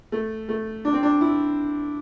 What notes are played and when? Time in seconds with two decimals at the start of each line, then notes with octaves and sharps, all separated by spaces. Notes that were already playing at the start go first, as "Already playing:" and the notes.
0.12 A3
0.49 A3
0.85 D4
0.93 C4
1.03 D4
1.21 E4